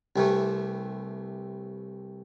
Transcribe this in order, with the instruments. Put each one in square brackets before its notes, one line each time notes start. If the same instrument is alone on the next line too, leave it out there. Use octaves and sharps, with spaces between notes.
[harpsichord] C2 C3 E3 A3